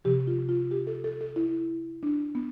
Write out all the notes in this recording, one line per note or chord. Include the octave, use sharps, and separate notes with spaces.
C3 F3 G4
F4
F4
G4
A4
A4
A4
E4
D4
B3